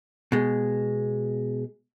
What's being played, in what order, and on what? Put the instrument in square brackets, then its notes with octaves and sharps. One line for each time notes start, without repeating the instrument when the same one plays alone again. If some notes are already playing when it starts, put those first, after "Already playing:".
[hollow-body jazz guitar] B2 G#3